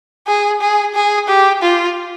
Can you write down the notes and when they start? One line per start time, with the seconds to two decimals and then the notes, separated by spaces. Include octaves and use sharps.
0.28 G#4
0.61 G#4
0.95 G#4
1.28 G4
1.62 F4